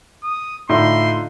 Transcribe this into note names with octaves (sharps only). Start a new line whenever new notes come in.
D#6
A2 D3 D#4 F4 C6